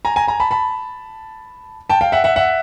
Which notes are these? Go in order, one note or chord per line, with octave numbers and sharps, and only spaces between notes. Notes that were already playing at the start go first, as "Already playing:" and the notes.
G#5 A#5
G#5 A#5
G#5 A#5
A5 B5
A5 B5
G5 A5
F5 G5
E5 F#5
E5 F#5
E5 F#5